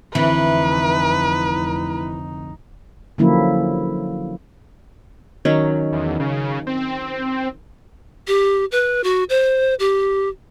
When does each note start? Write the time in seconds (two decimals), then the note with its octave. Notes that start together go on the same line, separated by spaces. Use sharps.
0.15 F1 D3 E3 C4 D#4 B4
3.18 D3 F3 F#3 A#3 C#4 E4
5.45 D#3 F#3 C#4
5.93 E2
6.20 C#3
6.67 C4
8.27 G4
8.72 B4
9.04 F#4
9.30 C5
9.79 G4